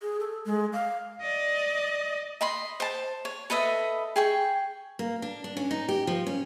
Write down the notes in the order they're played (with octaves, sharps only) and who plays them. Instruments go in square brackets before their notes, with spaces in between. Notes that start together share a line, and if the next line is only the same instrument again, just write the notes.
[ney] G#4
A4
G#3
F5
[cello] D5 D#5
[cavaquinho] D#5 B5 C6
C5 A5
C#5
A4 B4 D#5 E5
G#4 G5 C#6
[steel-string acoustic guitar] A#3
D4
D4
C#4
D#4
G4
F3
C#4